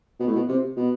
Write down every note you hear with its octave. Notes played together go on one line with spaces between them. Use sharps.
B2
A2
B2
C3
B2